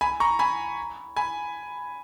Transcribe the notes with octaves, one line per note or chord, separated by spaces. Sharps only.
G#5 B5
A#5 C#6
G#5 B5
G#5 B5